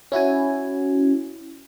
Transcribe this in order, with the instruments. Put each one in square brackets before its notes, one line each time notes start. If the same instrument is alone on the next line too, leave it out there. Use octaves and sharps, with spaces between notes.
[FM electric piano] C#4 E4 F#4 G#5